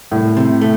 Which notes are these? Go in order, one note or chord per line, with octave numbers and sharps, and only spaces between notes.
C2 A2
C3
A3